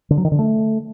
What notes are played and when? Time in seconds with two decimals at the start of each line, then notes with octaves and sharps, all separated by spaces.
0.10 D3
0.17 F#3
0.25 D#3
0.32 D3
0.39 A3